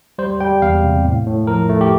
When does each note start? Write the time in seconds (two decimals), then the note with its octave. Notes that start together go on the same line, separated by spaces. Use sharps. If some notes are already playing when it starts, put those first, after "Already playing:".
0.18 G3 C5
0.40 G3 G5
0.62 E2 F5
0.83 C3
1.05 A2
1.27 A2
1.47 F3 A#4
1.69 A3
1.81 G4